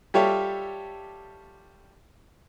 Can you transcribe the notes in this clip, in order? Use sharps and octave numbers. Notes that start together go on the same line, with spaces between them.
G3 F4 G4 A4 C#5 E5